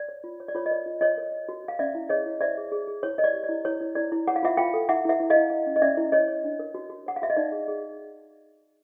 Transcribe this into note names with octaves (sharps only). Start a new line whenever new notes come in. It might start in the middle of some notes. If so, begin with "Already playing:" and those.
Already playing: D5
C#5
F4
C#5
D5
F4 C#5
D#5
A#4 D5
F4
F4 C#5 D#5
A#4
C#5
F#4
F#4 F5
C#4 D5 E5
E4
G#4 C#5 D#5
E4
C5 D5 E5
G#4
G#4
G#4
E4 C#5
A#4 D#5
D5
G4
D5
E4
E4 C#5
E4
E4 D5
E4
C#5 F#5
F5
F4 E5 F#5
F4 F5 G5
A4
E4 E5 F#5
E4 E5 F#5
E4
D#5 F5
E4
E4
C#4
D#5
C#4 D5 E5
E4
C#5 D#5
C#5
D4
A#4
F#4
F#4
C#5 F#5
F5
F#4 E5
D#5
D#4 D5
G#4
G#4